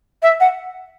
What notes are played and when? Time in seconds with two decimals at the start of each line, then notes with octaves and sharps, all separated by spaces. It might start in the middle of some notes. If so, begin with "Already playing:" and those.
0.22 E5
0.40 F#5